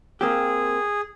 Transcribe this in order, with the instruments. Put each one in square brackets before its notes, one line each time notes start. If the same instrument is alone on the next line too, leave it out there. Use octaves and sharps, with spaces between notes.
[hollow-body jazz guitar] A#3 C4 G4 [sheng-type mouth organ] G#4